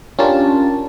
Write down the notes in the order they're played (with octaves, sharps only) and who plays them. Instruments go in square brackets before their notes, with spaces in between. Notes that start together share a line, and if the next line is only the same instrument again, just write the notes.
[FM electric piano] C#4 D4 F4 G4 A#4 A5